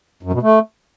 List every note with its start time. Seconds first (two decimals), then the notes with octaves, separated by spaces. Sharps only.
0.23 F#2
0.33 B2
0.42 A3